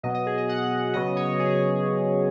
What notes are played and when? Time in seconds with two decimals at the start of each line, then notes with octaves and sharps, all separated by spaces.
0.03 B2 F#3 B3 D#5
0.14 D#5
0.26 G#4
0.38 D#5
0.49 F#5
0.93 C#3 F#3 B3 D#5
1.16 C#5
1.39 G#4
1.50 G#4